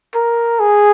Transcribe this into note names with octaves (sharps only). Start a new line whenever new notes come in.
A#4
G#4